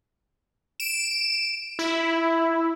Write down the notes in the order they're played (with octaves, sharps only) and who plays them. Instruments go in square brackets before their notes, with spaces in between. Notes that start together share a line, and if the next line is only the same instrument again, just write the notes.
[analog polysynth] D7 E7
E4